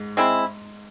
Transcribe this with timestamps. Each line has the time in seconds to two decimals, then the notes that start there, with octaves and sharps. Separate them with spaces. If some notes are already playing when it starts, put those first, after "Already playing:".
Already playing: G#2
0.17 G#3 C4 E4